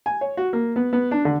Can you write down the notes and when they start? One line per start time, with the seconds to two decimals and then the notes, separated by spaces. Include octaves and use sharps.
0.06 G#5
0.21 C#5
0.37 F#4
0.53 A#3
0.76 B3
0.93 B3
1.11 D4
1.25 D3